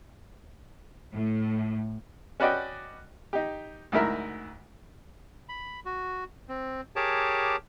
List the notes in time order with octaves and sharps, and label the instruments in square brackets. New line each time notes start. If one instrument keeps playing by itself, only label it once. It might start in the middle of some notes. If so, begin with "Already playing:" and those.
[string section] A2
[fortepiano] C#4 F#4 B4 D5 D#5 G5
D#4 G4
D2 G#2 E4 A#4 E5
[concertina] B5
F#4
C4
G4 G#4 A#4 C#5 A5 D6